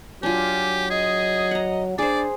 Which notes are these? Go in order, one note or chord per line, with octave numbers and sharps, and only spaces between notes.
F#3 D4 F4 G4 G#5
G#4 D#5
F#5 A#5
D4 G#4 C5 D5